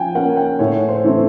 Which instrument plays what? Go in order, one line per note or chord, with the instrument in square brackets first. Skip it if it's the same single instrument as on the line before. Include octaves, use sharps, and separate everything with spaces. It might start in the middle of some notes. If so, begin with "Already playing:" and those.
Already playing: [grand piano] F3 G5 G#5
A#3 C#4 F#5
G5
A2 C#5
C5
E3 A3 C4